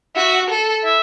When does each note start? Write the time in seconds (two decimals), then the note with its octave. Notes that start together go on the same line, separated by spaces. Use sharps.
0.15 F#4 E5
0.49 A4
0.84 E5